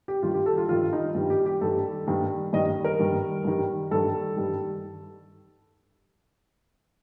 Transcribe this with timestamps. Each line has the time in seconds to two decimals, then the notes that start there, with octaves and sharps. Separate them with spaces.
0.08 G4
0.23 G2 D#3 G3 F4
0.34 G4
0.46 A4
0.57 F4
0.69 G2 D#3 G3 F4
0.93 D#4
1.15 G2 D#3 G3
1.30 G4
1.46 G4
1.61 G2 D#3 G3 A4
2.07 G2 D#3 G3
2.53 G2 D#3 G3 D#5
2.84 A#4
2.99 G2 D#3 G3
3.45 G2 D#3 G3
3.91 G2 D#3 G3 A4
4.37 G2 D#3 G3